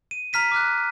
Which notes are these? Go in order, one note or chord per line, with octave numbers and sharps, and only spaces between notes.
D#7
A#5 F6 B6 D#7
D6 F6 F#6